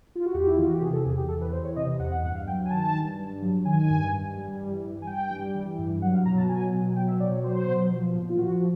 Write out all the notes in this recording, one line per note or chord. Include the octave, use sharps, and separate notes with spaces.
F4
F#4
E2 G4
E4
E3 F4
F#4
G4
C3 G#4
A4
E2 G#4
G4
E2 A4
B4
E3 C5
C#5
C3 D#5
E2 F#5
F#5
G2 F#5
F5
F#3 G5
G#5
D#3 A5
G2
G2
F#3
D#3 G#5
G2
G2
G3
E3
G2
G#5
G2 G5
G3
E3
G2
F#3 F#5
F5
B2 A#5
A5
F#3 G#5
B2
F#3 G5
E5
B2 D5
C#5
F#3 C5
B2
F3
A#2
F4
F3 F#4